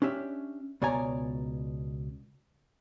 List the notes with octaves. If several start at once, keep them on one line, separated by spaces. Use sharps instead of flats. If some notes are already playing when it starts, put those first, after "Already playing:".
C#4 D4 G4 E5
C#2 B2 C#5 D5 G#5 A#5